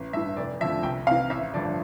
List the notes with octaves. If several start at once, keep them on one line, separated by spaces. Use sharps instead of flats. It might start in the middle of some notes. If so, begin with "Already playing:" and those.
Already playing: A1
G2 E3 E5
F1 D5
F2 D3 F3 E5
C2 G5
C3 E3 F5
A1 E5
G2 D3 F3 D5